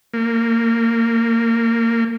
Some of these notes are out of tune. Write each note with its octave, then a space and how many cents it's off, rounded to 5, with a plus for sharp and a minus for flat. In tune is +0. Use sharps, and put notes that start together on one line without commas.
A#3 -20